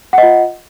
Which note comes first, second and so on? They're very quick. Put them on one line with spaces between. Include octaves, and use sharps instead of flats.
F#5 D#5 F4